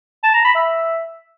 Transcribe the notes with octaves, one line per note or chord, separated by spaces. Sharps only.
A5
A#5
B5
E5